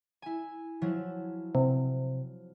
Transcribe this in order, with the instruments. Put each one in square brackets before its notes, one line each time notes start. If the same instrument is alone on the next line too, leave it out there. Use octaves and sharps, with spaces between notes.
[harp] E4 G#5
F3 F#3 E4
[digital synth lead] C3